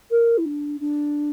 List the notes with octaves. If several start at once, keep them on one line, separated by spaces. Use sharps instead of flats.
A#4
E4
D4
D4